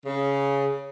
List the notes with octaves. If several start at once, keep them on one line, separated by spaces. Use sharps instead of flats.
C#3